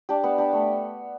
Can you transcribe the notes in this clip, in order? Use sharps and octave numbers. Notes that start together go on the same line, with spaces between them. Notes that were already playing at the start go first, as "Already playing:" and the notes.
D4 G4
B3
D4 G4
A3